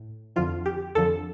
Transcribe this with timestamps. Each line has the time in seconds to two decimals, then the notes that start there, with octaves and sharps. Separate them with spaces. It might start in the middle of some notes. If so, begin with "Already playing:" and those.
Already playing: A2
0.36 F2 D3 F3 F4
0.66 G4
0.95 F2 D3 F3 A4